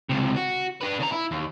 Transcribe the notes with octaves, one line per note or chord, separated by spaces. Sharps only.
C#2 C3
F#4
D4 B4
C#3 A#5
E4
D#2